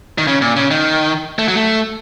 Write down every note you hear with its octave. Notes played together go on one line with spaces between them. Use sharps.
D#3
C#3
A#2
C#3
D#3
A3
F#3
A3